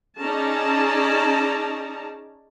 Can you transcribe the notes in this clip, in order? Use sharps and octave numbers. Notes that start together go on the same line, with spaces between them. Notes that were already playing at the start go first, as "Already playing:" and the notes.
C#4 D#4 G#4 D5 A5 A#5